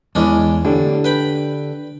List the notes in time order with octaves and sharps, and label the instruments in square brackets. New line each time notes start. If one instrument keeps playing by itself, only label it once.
[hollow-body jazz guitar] E2 E3 [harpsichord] G#3 C#4 D4
[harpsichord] A2 [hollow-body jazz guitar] D3 D4 G4
[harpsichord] B4 G5 B5